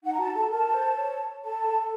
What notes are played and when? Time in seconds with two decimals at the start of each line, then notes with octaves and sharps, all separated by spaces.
0.04 D#4 F#5
0.13 A#5
0.19 F#4 A5
0.35 A4 A5
0.50 A#4 A5
0.74 C5
0.97 C#5
1.44 A4 A5
1.68 A4